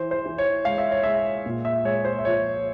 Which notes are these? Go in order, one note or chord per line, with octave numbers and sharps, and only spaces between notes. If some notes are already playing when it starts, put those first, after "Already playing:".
Already playing: E3 C5
C5
E3
C#5
G#3 F5
E5
C#5
G#3 E5
A#2
E5
G#3 C#5
C5
E5
F3 C#5